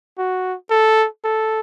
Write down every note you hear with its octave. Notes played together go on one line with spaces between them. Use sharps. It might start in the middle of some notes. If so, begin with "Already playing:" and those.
F#4
A4
A4